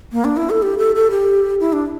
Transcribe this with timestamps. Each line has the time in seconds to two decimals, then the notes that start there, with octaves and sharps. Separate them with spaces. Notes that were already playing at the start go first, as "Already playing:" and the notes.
0.12 A#3
0.24 D4
0.37 E4
0.50 A4
0.62 G4
0.78 A4
0.95 A4
1.11 G4
1.60 E4
1.73 D4